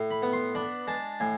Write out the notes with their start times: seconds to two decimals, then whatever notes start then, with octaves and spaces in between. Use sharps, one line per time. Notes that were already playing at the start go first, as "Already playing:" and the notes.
Already playing: A2
0.11 B5
0.22 B3
0.33 C6
0.55 D4 B5
0.87 G#3 A5
1.20 A2 G#5